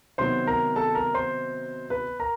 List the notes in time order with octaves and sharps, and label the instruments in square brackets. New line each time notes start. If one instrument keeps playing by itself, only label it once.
[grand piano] C3 D#3 F#3 B3 C5 C6
A#4 A#5
A4 A5
A#4 A#5
C5 C6
B4 B5
A#4 A#5